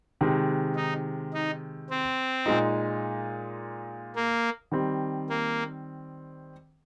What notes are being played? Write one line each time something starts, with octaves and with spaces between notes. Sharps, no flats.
C3 D#3 G#3
D#4
D#4
C4
A#2 G#3 D#4
A#3
D#3 G3 C4
A#3